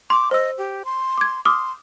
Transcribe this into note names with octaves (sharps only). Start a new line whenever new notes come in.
C6 D6
C5 D#5 E6
G4
C6
D6 G#6
C6 D6 D#6 F6